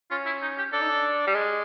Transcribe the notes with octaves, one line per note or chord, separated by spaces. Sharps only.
C#4 F4
E4
D#4
G4
D4 A4
D#4
D4
G3
G#3